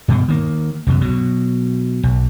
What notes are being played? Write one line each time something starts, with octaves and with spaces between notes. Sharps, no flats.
G2 B2
D#3 A#3
C2 F#2 B2
B2 F#3
B1